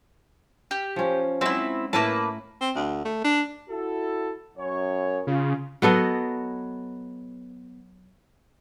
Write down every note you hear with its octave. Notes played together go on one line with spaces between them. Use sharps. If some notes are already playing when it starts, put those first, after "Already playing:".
G4
F3 C#4
F#3 G#3 C4 E4 E5
A2 A#3 E4 A#4 B4 A5
C4
D2
A3
D4
E4 F#4 A4
F#2 C#5
C#3 F4
F#3 B3 A4 D#5